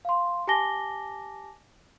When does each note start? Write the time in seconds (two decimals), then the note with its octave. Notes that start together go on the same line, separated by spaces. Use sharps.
0.05 F5 C6
0.47 G4 G#5 A5 D6 A#6 G7